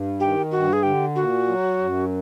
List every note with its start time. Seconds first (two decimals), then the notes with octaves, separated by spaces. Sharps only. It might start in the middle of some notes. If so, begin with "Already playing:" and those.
Already playing: G2
0.20 D#3 G4
0.51 G2 F#4
0.73 G#4
0.83 D3 G4
1.15 A#2 F#4
1.48 F#3
1.79 F#2